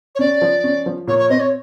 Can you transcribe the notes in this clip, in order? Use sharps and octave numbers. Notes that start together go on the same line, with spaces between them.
C#5
C#4 D5
F3
C#4
F3
A#2 C#5
C#5
C4 D#5
C#5